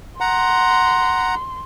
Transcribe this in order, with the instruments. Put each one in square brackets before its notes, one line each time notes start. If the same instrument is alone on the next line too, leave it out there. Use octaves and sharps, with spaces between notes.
[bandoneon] F#5 A#5 [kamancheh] C6